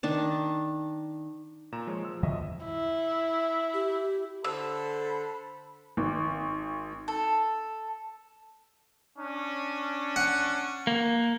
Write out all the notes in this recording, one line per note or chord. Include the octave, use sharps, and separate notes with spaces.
D#3 D4 A5
A#2 A#5 E7
F3 G#3 C#5
F3 E6
G1 E2 D3 F#3 D#5 E5
E4
G4
D3 A4 C5 B5 E6
G#1
A4
C#4 D4
F#5
A#3